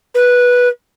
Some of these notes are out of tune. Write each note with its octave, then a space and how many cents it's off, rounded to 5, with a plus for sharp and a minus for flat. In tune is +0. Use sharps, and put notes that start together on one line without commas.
B4 -10